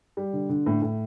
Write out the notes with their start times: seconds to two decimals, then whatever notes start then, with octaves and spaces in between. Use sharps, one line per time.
0.17 G3
0.33 D3
0.49 D3
0.66 A2
0.82 A2